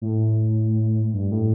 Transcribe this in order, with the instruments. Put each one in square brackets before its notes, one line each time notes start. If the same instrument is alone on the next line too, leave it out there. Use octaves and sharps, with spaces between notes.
[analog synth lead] A2
G2
A2